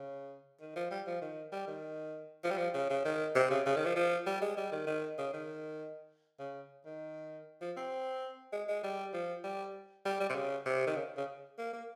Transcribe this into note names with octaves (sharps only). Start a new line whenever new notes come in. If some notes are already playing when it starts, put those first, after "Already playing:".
Already playing: C#3
D#3
F3
G3
F3
D#3
G3
D#3
F3
G3
F3
C#3
C#3
D#3
C3
C#3
C#3
D#3
F3
F3
G3
G#3
G3
D#3
D#3
C#3
D#3
C#3
D#3
F3
C4
G#3
G#3
G3
F3
G3
G3
G3
C3
C#3
C3
D#3
C#3
C#3
A#3
A#3